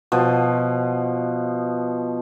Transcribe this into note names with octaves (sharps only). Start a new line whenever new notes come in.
B2 F3